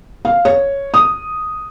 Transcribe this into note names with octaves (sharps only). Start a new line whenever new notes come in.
F5
C#5
D#6